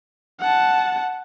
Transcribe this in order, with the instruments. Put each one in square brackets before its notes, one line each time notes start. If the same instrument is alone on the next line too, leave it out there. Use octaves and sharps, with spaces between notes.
[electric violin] F#5 A5